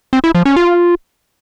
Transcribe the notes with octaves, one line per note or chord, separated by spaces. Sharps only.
C4
E4
F3
C#4
F4